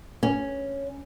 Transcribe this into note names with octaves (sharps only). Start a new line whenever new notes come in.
C#4